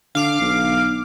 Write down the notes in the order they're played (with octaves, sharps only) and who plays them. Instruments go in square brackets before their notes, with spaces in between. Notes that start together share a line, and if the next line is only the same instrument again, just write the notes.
[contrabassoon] D3 [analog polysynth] F5 D6
[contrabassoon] B1